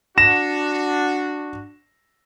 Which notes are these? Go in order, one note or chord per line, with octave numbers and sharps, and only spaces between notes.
D4 F#4 A#6 E7